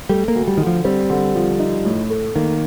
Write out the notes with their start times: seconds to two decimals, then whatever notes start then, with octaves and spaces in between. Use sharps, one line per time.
0.09 G3 A3
0.28 A#3
0.35 D2
0.48 G3
0.57 D3 D#3
0.67 F3
0.84 G3 C4
1.10 D3
1.35 F3
1.59 D#4
1.85 A2
2.10 A3
2.36 D#3 A#3